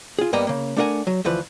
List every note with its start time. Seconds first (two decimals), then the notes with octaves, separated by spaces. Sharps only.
0.19 F4 G#4
0.33 G2 G3 A#3 B3 D#5 A#5
0.47 C#3 A#3
0.77 A3 D4 E4 A#4 F#5 G#5
1.07 F#3
1.25 D2 E3 F3 B4